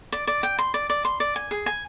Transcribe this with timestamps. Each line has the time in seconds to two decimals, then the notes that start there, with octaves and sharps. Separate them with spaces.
0.12 D5
0.27 D5
0.43 G5
0.59 C6
0.74 D5
0.90 D5
1.05 C6
1.20 D5
1.36 G#5
1.51 G#4
1.66 G#5